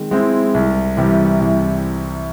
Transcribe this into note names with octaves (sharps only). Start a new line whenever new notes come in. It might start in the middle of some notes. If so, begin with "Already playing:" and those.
Already playing: D#3 G#3 C4
G#3 C4 E4
C2
C3 E3 G3
C2